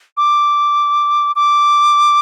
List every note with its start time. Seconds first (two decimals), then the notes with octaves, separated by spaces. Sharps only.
0.17 D6
1.36 D6